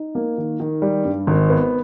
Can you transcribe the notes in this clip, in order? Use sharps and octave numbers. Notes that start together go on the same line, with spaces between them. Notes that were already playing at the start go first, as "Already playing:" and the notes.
Already playing: D#4
A#3
D#3
D#3
G3
G2
G#1
B3